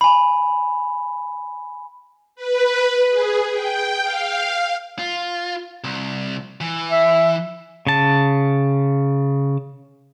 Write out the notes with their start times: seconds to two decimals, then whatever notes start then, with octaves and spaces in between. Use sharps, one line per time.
0.01 G#5 B5
2.36 B4
3.09 G#4
3.50 G5
4.02 F5
4.99 F4
5.84 C2
6.61 E3
6.90 E5
7.87 C#3 A5